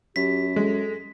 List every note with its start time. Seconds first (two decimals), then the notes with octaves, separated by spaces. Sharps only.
0.16 F#2 G4 B6
0.56 G#3 A4